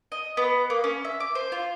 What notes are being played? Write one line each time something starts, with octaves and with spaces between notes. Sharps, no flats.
D#5
B3
A#3
C#4
E5
D6
C5
F4